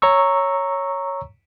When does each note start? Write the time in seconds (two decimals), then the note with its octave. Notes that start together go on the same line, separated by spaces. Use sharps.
0.02 C#5 A#5 C#6 E6